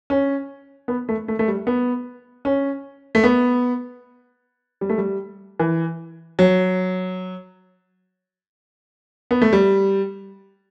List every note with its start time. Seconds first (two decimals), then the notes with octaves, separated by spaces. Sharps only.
0.10 C#4
0.88 B3
1.09 A3
1.28 A3
1.39 A3
1.48 G3
1.67 B3
2.45 C#4
3.15 A3
3.24 B3
4.81 G3
4.89 A3
4.98 G3
5.59 E3
6.39 F#3
9.31 B3
9.42 A3
9.53 G3